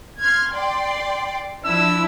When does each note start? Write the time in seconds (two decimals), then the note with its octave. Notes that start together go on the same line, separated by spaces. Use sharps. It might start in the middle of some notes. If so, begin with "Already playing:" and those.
0.21 C6 F6 G#6
0.54 D5 G5 C6
1.65 F3 D4 E4 E6